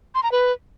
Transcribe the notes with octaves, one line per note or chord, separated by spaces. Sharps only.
C6
A#5
B4